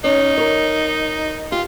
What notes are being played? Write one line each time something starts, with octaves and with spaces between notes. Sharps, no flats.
C#4 D#4
A#4 C#5
F4 G4